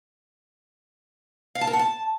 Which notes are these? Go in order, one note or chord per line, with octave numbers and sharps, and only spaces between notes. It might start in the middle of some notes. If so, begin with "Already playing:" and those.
F5
A5
A#4
F#5
A5